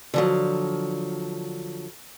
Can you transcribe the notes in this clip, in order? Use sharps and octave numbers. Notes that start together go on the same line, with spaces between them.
D3 F3 F#3